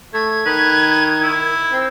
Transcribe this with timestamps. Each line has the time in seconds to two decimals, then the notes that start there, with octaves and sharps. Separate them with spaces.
0.14 A3 G#6
0.46 D#3 B4
1.23 E4
1.72 C4